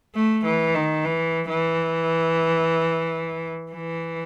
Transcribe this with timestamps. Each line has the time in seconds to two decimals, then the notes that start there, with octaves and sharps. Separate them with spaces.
0.15 A3
0.45 E3
0.75 D#3
1.05 E3
1.49 E3
3.72 E3